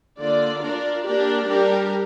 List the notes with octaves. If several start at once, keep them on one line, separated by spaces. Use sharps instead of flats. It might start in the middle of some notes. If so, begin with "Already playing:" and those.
D3 A#3 F4 D5
D4 F4 A#4 D5
A#3 D4 G4 A#4 D5
G3 D4 G4 A#4